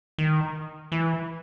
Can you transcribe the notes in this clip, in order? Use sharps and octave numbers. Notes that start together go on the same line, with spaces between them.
D#3
E3